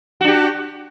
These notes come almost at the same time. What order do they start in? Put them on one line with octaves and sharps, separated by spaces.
F#4 D4 G4